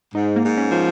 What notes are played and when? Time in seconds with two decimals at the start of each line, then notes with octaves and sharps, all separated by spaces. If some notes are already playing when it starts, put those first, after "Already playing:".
0.14 G#2 D#4
0.36 A#3
0.43 G#2
0.57 C#4
0.71 F3